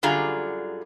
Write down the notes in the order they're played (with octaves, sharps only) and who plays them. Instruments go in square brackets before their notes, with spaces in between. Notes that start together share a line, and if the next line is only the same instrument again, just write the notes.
[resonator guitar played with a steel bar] F#2 D3 G3 F4 G#4 A#5